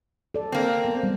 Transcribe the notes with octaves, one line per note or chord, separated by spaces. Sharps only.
A4 D5
A#3 C4
B3
G3